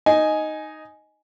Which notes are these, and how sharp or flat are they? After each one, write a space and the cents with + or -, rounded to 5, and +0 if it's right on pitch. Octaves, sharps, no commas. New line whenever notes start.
D#4 +0 G#5 +10